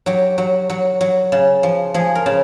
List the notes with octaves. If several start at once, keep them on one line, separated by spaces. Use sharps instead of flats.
F#3 G4
F#3
F#3
F#3
C#3
F3
F3 G#4
A#4
C#3